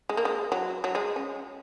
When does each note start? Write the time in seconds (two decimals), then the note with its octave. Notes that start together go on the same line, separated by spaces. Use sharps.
0.09 G#3
0.17 A#3
0.25 G#3
0.52 F#3
0.84 F#3
0.95 G#3
1.16 C#4